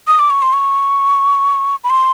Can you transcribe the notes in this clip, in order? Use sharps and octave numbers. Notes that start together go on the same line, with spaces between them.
D#6
D6
C#6
C6
C#6
B5
C6